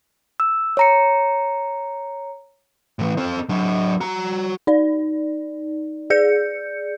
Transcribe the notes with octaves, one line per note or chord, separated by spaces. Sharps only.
E6
C#5 A#5 C#7
A2 E3
C4 A4
F#3 D4
F#4 A#5
D#4 D5
G#4 D5 G6 C#7